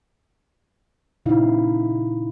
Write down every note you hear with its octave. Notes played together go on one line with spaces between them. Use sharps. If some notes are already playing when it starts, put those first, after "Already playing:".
A#2 C#3 D#4 E4 F5